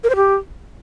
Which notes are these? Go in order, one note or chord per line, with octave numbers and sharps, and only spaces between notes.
A#4
C5
G4